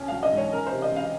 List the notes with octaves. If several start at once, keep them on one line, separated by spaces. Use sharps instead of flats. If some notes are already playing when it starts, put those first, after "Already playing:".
Already playing: C2 C#4
F#3 F5
D#5
G#2
C#5
C#4 A#4
C5
C3
D#5
C#2 F5